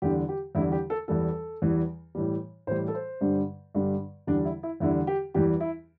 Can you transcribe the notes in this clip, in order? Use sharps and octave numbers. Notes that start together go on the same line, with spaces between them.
E2 D3 G3 G4
G4
E2 D3 G3 E4
G4
A4
E2 E3 G3 A4
E2 E3 G3
A2 E3 G3
A2 E3 G3 C5
A4
C5
G2 D3 G3
G2 D3 G3
E2 D3 G3 D4
E4
E4
E2 D3 G3 E4
G4
E2 E3 G3 G4
E4